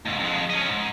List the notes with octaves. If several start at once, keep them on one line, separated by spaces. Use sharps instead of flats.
D#2 G#2
F2 G#3
C#4 D#5
G#2